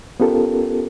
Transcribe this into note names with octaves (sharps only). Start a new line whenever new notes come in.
B3 C#4 F4 G4 A4 A#4